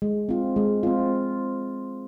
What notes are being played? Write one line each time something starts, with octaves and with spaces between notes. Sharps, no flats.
G#3
C4 F4
G#3
C4 F4